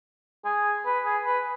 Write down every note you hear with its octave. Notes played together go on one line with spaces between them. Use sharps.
G#4
B4
G#4
B4